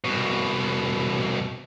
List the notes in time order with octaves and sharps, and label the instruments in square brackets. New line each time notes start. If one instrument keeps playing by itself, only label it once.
[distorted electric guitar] C2 B2